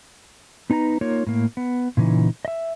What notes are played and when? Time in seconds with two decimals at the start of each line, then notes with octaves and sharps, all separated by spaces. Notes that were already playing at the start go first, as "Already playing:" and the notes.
0.70 B3 D#4 B4 A5 A#5
1.01 A#3 D#4 F4 A#4 C#5
1.27 A2 A#3
1.57 B3
1.97 A#2 C#3 E3 D#4
2.45 D#5 E5